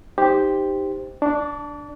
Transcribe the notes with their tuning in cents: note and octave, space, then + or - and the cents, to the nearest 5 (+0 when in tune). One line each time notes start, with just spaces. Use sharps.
D#4 +0 G4 +5 C5 -5
D4 +0 D6 -40